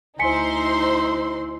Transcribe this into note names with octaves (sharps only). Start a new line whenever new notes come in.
D2 D#4 E4 C5 G#5 C6 B6 C#7